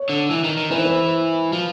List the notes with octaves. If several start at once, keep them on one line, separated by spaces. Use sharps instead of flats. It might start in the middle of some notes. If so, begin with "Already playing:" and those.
Already playing: C#5
D3
E3
D#3
D#3
E3 B4
C5
B4
F3